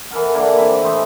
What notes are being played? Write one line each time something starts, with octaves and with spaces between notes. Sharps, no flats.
E3 A4 A#4 F#5
D3 E3 A#3 D4
C3 E5 B5 D6
E3 A3 C5 D#5